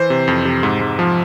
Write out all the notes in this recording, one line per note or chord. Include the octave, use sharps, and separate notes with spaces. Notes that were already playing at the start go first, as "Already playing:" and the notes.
Already playing: E3 C5
C3
F2
C3
G#2
G#2
F3